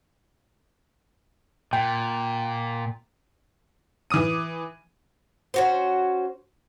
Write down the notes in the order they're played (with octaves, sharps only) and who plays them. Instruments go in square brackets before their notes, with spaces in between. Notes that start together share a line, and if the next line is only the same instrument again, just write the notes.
[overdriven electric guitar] A#2 [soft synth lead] G5
[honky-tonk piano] E3 D6 D#6 D#7
[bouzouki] C#4 F#4 C5